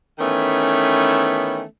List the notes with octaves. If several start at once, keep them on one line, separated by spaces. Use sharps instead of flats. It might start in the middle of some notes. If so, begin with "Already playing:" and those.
D#3 E3 A3 B3 C#4